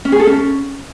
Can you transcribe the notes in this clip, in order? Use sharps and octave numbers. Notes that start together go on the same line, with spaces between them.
C#4
G#4
A4
C#4